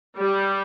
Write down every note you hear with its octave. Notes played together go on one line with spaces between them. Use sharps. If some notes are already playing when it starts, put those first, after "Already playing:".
G3